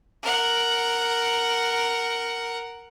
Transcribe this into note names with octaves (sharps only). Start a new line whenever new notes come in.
A#4 F#5